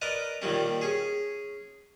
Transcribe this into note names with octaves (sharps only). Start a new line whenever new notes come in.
A#4 B4 D5 D#5
D#2 A#2 D#3 G3 C#4
C#4 G#4